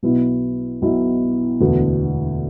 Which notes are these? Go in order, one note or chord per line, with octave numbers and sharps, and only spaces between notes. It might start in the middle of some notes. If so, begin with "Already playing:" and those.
B1 B2 B3 E4
B1 B2 B3 E4
E1 D2 D3 B3 D4